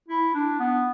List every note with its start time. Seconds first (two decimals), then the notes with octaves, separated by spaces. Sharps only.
0.08 E4
0.34 D4
0.60 B3